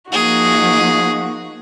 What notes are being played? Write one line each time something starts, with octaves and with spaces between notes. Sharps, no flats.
F3 A#3 D#4 F#4 G#4